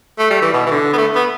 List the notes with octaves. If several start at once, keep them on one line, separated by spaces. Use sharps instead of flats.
A3
G3
E3
B2
E3
D3
B3
A3
B3